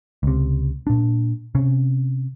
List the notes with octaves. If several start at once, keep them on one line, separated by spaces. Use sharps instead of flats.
C#2 C3
A#2 D4
C3 C#4